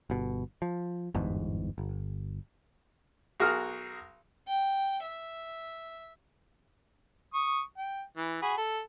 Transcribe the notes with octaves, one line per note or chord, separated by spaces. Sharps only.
G1 B2
F3
G1 E2 G#2
G1
B1 F#4 G#4 A#4 F6
G5
E5
C#6 D#6
G5
E3
F#4 G#4 B5
A4